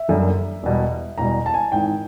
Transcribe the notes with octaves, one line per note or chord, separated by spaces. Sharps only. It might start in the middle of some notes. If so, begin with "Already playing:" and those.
Already playing: E5
F#1 F#2 D3 G3
E1 E2 B2 G3
E1 E2 B2 G3 A#5
A5
G#5
G#1 G#2 E3 G5